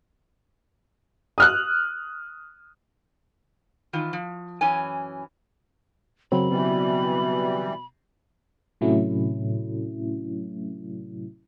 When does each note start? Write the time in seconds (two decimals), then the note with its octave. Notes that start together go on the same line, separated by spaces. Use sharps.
1.38 D#6 F6 F#6
3.93 D#3 E3 F4
4.13 F3
4.61 F#2 E3 C#4 G#5
6.32 F#2 C#3 F#3 C4 B5
6.50 B2 E3 G3
8.81 A2 C3 F#3 A3 C#4 E4